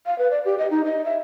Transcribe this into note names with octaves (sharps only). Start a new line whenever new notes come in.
F5
B4
D5
G4
D#5
D#4
D#5
E5